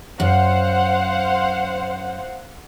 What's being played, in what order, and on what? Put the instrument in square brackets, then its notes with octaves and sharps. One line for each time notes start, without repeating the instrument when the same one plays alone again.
[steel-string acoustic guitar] F#2 [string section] C5 F5 F#5